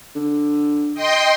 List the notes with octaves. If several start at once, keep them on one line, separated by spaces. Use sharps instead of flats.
D3
D#5 G5 C6